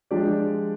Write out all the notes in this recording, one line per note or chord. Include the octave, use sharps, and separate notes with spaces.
F3 G#3 D4 G4 D5